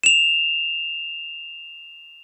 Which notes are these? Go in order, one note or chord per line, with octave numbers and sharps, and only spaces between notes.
E7 F7